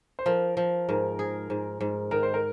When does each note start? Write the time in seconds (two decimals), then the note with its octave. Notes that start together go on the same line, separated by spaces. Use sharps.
0.19 C5
0.26 F3 A#4
0.57 F3
0.88 G#2 A#4
1.19 G#4
1.50 G#2
1.81 G#2
2.11 D#3 A#4
2.23 C5
2.34 A#4